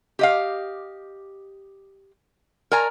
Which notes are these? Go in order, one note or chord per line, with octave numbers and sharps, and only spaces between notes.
G4 D#5 F5
A#4 D5 G#5 A#5